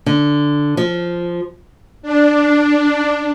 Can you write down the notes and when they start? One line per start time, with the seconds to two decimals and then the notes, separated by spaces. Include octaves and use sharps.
0.06 D3
0.77 F3
2.02 D4